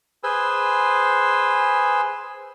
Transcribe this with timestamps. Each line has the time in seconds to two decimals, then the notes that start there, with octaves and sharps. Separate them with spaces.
0.24 G#4 B4 C5 G#5 C6 E6